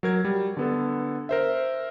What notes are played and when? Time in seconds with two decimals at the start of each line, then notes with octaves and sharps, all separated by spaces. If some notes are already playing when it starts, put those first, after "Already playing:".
0.03 F#3 A#4 G#6
0.25 G3
0.57 D3 B3 A4
1.29 A#4 C5 E5